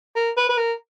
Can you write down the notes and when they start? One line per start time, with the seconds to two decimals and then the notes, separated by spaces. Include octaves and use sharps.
0.15 A#4
0.37 B4
0.49 B4
0.58 A#4